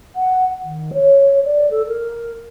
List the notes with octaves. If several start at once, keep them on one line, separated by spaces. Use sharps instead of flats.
F#5
D#3
C#5
D5
A4
A#4